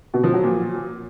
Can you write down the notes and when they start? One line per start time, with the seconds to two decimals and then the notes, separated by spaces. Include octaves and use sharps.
0.14 B2
0.24 F3
0.33 F#3
0.43 A#2